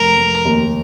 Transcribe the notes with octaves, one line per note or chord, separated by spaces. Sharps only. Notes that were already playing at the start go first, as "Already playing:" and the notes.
Already playing: F1 A#4
F1
D#2